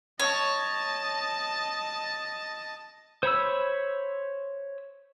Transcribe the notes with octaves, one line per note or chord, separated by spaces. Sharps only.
C#5 D#5 A5
C5 C#5 B5 E6